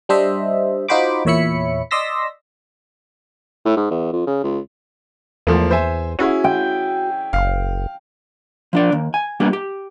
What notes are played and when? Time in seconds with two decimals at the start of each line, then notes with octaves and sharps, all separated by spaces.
0.09 G3 D4 C5 D#5 E5
0.88 D#4 F4 F#4 C5 B5 D6
1.25 E2 A#2 C#5 E5 B5 C#7
1.91 D5 D#5 C6 E6 A#6 B6
3.65 A2
3.77 G#2
3.91 E2
4.13 F2
4.26 C#3
4.44 C#2
5.47 E2 F3 A3 A#3
5.71 C5 E5 G#5
6.19 C#4 E4 F#4 G#4
6.44 G5
7.33 F#1 F5
8.73 F3 D4 D5
8.92 D#2
9.14 G#5
9.40 G3 A#3 B3 D4 G4
9.53 G4